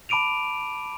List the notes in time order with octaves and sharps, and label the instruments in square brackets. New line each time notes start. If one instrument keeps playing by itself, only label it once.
[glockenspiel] A5 B5 D6 D7 D#7 F7